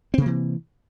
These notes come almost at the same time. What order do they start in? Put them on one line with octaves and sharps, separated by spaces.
C4 C3 A#3 E3